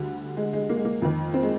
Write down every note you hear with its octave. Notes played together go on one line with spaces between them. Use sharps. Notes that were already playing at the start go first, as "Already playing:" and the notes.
Already playing: D2 D3 G3
G#3
G#3
A#3
G#3
A#3
F2 D#3
C4
G#3